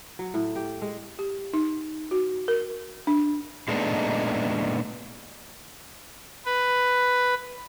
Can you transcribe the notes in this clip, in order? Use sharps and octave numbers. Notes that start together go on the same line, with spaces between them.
F#3
A2
G4
G#3
G4
D#4
F#4
A#4
D4
A#2 G#3 A3 B3 D4 D#4
B4